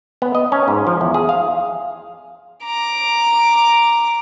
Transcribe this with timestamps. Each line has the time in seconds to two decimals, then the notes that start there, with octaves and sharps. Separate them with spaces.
0.22 B3
0.35 D#5
0.52 C#4
0.68 G#2
0.87 F3
1.01 E2
1.14 G#4
1.29 F5
2.65 A#5 D6